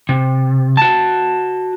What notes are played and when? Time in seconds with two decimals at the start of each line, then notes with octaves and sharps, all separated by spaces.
0.09 C3
0.77 F#4 A5